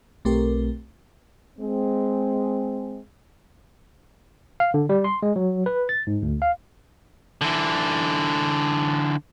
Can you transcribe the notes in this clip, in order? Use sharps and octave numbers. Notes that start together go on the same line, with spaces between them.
B1 A3 C4 G4 A#4
G#3 C4
F5
D3
G3
C6
G#3
F#3
B4
A6
G#2
D2
F5
D3 E3